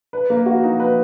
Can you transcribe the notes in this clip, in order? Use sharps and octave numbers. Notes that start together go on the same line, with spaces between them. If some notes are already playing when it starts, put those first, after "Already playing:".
B4
A#3
F#4
D#4
B4